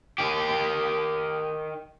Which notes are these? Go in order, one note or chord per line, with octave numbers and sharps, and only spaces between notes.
D#3 G4